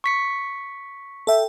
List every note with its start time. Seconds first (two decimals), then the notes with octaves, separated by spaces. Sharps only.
0.04 C#6 B6 C#7
1.27 A4 E5 G5